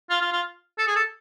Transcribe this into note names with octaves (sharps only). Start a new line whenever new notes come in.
F4
F4
F4
A4
G#4
A4